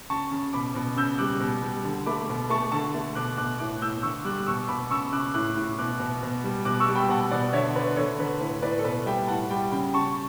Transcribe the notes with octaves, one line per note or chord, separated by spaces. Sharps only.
C#3 A5 C#6
C#3
B2 B5 D6
B2
C#3 E6 G6
G3 D6 F#6
B2
G3
D3
A3 B5 D6
B2
A3 A5 C#6
D3 A5 C#6
A3
B2 D6 F#6
B2 D6 F#6
A2 D6 F#6
A2 E6 G6
D3 C#6 E6
G3 D6 F#6
B2 C#6 E6
B2 B5 D6
C#3 C#6 E6
C#3 D6 F#6
A2 D6 F#6
A2
B2 D6 F#6
B2
B2
G3
B2 D6 F#6
C#6 E6
G3
G5 B5
B2 F#5 A5
B2 D5 F#5
D3 C#5 E5
D3 B4 D5
D3 A4 C#5
D3 B4
A2 B4
A2 B4 D5
A4
B2 B4
G3 E5 G5
A2 F#5 A5
G3 G5 B5
C#3 G5 B5
C#3 A5 C#6